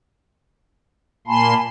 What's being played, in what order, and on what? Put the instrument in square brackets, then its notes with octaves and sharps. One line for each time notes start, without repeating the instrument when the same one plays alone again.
[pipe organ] A#2 A#3 C6 [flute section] G#5 A5 B5